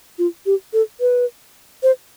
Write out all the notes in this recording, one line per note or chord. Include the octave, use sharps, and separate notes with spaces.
F4
G4
A4
B4
C5